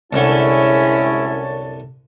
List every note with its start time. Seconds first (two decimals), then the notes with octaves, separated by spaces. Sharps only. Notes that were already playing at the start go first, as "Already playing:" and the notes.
0.13 C2 F#2 D3 G#3 C#4 E4 C#5 A5